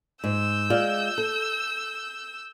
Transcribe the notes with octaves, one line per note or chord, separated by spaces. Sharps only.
G#2 E6 G6
G#3 F4 D5
A4